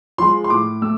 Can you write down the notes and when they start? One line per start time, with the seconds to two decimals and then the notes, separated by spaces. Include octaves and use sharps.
0.18 F3 G#3 C6
0.44 C6
0.50 A2 D6
0.82 A3 E6